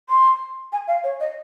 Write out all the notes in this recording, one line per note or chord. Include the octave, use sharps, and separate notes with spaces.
C6
G#5
F5
C#5
D#5